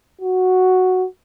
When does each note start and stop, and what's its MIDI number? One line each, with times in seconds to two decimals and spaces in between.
0.21 1.05 66